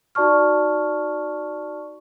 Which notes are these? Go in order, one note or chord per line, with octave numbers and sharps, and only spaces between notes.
D#4 F#4 D5 A5 C#6 F6